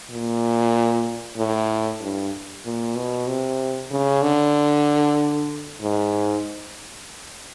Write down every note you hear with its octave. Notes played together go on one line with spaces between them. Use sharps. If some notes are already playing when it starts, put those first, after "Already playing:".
A#2
A2
G2
A#2
B2
C3
C#3
D3
G#2